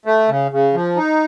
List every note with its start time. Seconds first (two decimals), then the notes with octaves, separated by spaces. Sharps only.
0.06 A3
0.29 C#3
0.51 C#3
0.74 F3
0.96 D#4